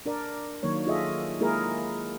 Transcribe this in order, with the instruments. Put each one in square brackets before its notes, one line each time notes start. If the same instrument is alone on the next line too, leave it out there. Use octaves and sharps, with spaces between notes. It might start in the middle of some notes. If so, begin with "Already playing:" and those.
[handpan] D4 A#4 D5
D#3 F#3 A#3 C#5
F4 G#4 A4 D#5 E5
G#3 A#3 E4 F4 G#4 A#4